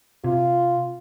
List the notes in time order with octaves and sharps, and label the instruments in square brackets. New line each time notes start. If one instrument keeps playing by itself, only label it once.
[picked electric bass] C3 [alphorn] F4